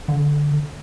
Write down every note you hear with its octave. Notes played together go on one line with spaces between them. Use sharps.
D3